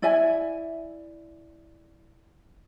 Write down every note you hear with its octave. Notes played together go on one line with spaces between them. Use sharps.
E4 D5 E5 G#5